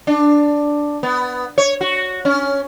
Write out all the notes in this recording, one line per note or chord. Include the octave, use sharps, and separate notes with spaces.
D4
B3
C#5
F#4
C#4